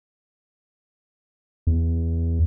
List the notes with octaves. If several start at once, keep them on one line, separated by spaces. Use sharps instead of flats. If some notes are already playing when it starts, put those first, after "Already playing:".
E2